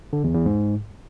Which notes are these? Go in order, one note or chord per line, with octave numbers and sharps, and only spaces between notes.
D3
E2
E2
G#2